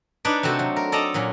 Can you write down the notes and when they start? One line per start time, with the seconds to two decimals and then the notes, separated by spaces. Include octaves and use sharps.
0.25 D4 D#4 B4 C#5 D5
0.43 C3 A3 C4 F#4
0.59 F#3
0.76 A#4
0.92 A4 D5 D#5 A5 A#5
1.14 A#2 F#3 C#4